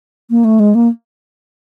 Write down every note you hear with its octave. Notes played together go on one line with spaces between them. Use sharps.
A#3
A3
G#3
A#3